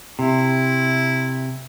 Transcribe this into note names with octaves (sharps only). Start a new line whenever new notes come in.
C3 E4